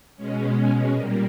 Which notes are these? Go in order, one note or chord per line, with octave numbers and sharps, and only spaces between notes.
B2 G#3 C#4
A#2 G3 A#3